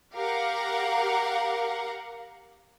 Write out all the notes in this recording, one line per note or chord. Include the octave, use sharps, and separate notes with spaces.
G4 A#4 F5 F#5 A#5